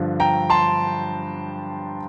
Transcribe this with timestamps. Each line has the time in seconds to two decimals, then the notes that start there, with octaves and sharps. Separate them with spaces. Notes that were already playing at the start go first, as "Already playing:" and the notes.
Already playing: G2 D3 F3
0.20 G5 A#5
0.50 A5 C6